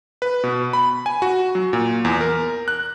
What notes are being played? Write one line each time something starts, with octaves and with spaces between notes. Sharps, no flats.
B4
B2
B5
G#5
F#4
F#3
A#2
E2
A#4
F#6